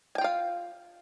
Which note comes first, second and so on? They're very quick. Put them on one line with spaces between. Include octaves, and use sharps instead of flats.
G#5 G5 F4 F5